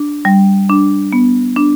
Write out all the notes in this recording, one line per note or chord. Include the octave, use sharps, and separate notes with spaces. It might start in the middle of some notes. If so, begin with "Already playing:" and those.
Already playing: D4
G3
D4
B3
D4